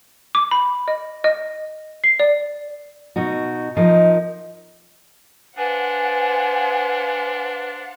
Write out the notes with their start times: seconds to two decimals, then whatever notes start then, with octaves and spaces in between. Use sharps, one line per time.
0.35 D6
0.51 B5
0.88 D#5
1.24 D#5
2.04 C7
2.20 D5
3.16 B2 D#4 F#4
3.77 F3 D#4 A#4 D#5
5.58 D4 B4 C5 F5 F#5 G#5